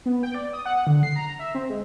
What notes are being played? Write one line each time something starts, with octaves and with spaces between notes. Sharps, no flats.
B3
G5
D5
D#6
F#5
D3
C7
A#5
E5
C4
G#3